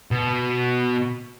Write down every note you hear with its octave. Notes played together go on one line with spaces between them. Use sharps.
B2